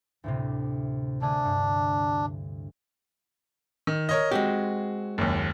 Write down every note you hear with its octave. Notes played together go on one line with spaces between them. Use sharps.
D2 A2 C3
D3 A3 D4 G#4
G2
D#3
A#4 C#5 D#5
G#3 C4 F#4 G4
F#1 D#2